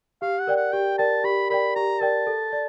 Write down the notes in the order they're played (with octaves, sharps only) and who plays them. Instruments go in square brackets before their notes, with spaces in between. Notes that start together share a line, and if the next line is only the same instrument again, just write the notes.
[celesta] G4 [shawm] F5
[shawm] F#5
[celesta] A#4 D5 G5
[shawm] F#5
[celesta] G4 [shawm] G5
[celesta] A#4 D5 G5 [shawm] A5
[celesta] G4 [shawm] B5
[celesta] A#4 D5 G5 [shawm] B5
[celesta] G4 [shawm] A#5
[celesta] A#4 D5 G5 [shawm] A5
[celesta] A4
D5